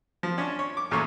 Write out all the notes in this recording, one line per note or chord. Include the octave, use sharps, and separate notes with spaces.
F3
C#4 D4 C#5
C#5
D6
E2 A#2 A3 C#4 C#5